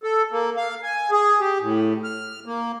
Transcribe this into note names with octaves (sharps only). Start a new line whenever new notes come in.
A4
A#3
F5
G#5
G#4
G4
A2
F6
A#3